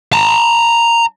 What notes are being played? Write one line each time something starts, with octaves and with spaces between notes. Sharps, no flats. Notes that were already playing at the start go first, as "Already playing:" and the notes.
A5 A#5